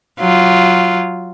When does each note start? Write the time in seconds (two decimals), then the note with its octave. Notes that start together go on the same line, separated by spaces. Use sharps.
0.19 F#3 F4